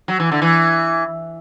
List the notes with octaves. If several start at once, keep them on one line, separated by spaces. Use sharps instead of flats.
F#3
E3
D3
E3